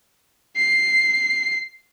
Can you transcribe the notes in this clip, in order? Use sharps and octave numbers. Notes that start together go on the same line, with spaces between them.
C7